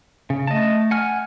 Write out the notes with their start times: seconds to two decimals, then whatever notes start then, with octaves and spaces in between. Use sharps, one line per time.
0.30 C#3
0.47 A3 D#5 A5
0.91 F#5 G#5 F6